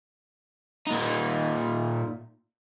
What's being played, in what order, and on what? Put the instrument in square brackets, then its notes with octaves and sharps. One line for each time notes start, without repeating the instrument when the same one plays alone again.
[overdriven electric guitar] A#2 D#4